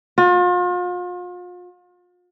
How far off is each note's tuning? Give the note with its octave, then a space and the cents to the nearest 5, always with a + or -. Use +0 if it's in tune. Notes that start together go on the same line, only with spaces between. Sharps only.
F4 +40